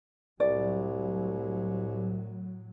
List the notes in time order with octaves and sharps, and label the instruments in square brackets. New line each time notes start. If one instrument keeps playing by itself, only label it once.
[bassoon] C2 [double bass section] A2 F#3 [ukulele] D5